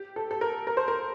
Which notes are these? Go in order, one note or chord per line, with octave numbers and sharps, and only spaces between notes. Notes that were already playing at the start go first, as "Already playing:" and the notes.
Already playing: G4
A4
A4
A#4
A#4
C5
A#4